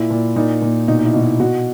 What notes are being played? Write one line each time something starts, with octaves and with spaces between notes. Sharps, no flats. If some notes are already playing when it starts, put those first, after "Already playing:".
Already playing: A#2 E4
A#2
A#2 D#4
A#2
B2 D#4
D#4
E4
B2
E4
B2 F#4